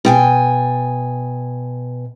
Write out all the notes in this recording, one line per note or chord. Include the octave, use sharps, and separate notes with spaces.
B2 G5 G#5